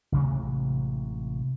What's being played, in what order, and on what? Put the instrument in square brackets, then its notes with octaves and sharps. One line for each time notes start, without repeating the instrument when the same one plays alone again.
[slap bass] A1 C3 F#3 G#3